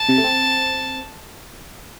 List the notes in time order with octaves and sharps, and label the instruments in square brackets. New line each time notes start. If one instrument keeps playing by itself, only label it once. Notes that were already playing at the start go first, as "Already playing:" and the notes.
Already playing: [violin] A5
[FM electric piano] C3
A3
C4